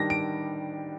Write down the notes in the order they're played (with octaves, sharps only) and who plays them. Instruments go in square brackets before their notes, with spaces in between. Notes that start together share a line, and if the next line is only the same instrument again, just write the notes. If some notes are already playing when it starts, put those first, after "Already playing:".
Already playing: [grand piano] D#3 G3 D4 A#6
D7